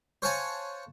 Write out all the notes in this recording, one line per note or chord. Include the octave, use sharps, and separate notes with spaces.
C5 C#5 F5 F#5 G#5 A5